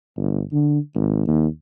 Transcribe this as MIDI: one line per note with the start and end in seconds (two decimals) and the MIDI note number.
0.16 0.42 31
0.53 0.79 50
0.95 1.25 32
1.27 1.47 39